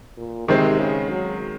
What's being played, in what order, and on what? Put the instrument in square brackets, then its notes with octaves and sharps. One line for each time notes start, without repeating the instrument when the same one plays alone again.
[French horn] A#2
[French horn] C3 [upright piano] D#3 G#3 C4
[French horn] C#3
F#3